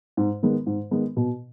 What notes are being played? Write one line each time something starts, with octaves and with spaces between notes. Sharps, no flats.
G#2
D#3 G#3 B3
G#2
D#3 G#3 B3
B2